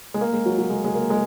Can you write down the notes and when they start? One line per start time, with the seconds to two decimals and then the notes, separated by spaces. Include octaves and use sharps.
0.14 G#3
0.21 A#3
0.33 G#3
0.46 F#3
0.58 F#3
0.70 G#3
0.85 G#3
0.95 A#3
1.10 G#3